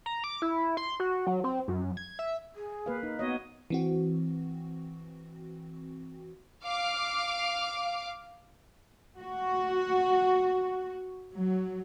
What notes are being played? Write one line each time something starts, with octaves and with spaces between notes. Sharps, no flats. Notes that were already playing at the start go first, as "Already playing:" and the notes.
A#5
D6
E4
C6
F#4
F#3
C4
F#2
G#6
E5
G#4
A#3 B4 F5
D#4
B3 F#4 C#5 D#5
E3 C4 F#4
F5 D6
F#4
F#3